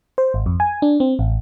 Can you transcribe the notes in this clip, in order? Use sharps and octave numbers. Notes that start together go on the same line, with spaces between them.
C5
G#1
F2
G#5
D4
C4
A1